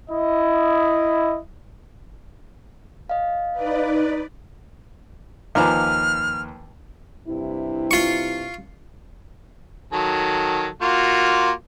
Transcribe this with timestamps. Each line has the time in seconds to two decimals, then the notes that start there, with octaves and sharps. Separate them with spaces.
0.10 E4 D#5
3.09 D#5 F5
3.52 D#4 B4 D5
5.55 D#2 F3 B4 G#5 A#5 D6 F6
7.28 G2 C3 E4
7.91 F4 C#6
9.93 D#3 F#3 A4
10.82 A#3 F4 F#4